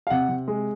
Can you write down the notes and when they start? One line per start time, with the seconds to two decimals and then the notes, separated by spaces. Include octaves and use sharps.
0.07 F5
0.10 C3 F#5
0.29 C3
0.48 G#3